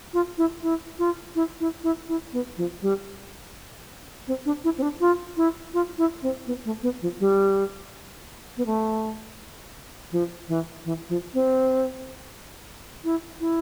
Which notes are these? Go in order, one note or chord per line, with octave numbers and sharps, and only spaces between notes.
F4
E4
E4
F4
E4
E4
E4
E4
B3
F3
G3
C4
D4
E4
C4
D4
F4
E4
F4
E4
C4
B3
A3
B3
F3
G3
B3
A3
F3
E3
E3
F3
C4
E4
E4